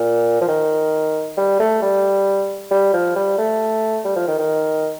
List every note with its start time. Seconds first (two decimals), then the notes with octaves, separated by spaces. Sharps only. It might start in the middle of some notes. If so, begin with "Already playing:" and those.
Already playing: A#2
0.41 F3
0.48 D#3
1.37 G3
1.60 A3
1.82 G3
2.71 G3
2.93 F3
3.16 G3
3.38 A3
4.04 G3
4.16 F3
4.28 D#3
4.39 D#3